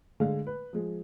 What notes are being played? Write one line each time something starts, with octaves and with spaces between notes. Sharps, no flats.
D3 G#3 A3 F5
B4
F3 G#3